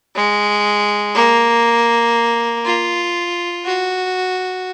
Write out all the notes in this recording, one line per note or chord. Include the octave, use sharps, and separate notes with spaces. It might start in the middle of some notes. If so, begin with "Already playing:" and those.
G#3
A#3
F4
F#4